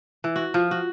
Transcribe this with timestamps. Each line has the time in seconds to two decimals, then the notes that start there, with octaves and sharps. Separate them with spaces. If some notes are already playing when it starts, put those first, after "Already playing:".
0.24 E3
0.36 F#4
0.54 F3
0.71 F#4